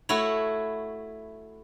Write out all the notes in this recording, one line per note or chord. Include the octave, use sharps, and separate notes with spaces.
A3 E4 F#4 C#5